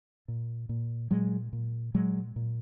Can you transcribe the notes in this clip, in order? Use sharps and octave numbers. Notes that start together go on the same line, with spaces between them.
A#2
A#2
A#2 F#3 G#3
A#2
A#2 F#3 G#3
A#2